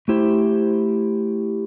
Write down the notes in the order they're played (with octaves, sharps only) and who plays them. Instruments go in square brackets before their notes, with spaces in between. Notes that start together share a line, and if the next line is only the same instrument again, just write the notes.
[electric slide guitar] A3 E4 G4 C5